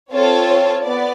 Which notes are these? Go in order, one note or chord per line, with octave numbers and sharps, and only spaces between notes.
C4 F4 A4 C#5
B3 D5